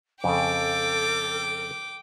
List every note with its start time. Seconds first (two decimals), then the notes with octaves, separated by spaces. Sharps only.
0.24 F2 C#3 A4 G5 D6